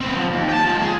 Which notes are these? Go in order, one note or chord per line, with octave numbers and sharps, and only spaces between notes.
C4 B4
F3
D#2
G5 A5
F3 G#3
G#4